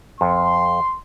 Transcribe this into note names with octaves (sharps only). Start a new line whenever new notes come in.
F2 C6